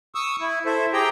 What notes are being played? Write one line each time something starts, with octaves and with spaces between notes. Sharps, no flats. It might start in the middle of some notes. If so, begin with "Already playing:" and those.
C#6 D#6 E6
E4
E4 A4 C5 E5
G4 G#4 G5 A#5